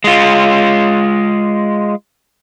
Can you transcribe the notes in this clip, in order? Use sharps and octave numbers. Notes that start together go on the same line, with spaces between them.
G#3 F4